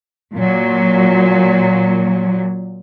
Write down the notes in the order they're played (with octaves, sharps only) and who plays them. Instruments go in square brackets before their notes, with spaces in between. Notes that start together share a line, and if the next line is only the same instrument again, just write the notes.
[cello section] A#2 F#3